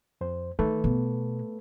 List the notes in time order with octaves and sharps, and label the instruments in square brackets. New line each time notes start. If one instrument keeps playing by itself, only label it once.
[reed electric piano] F2 C5
[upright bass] D#3 [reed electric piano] A3 A4 B4
[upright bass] B2